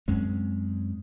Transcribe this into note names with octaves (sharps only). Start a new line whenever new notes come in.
F#2 G#3 C4 C#4